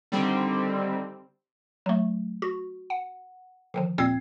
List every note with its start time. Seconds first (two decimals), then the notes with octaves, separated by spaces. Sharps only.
0.12 D3 D#3 G3 C4
1.86 F#3 A3
2.42 F#4
2.90 F#5
3.74 D3 D#3 F3
3.98 D#2 A#2 C4 G#6 C7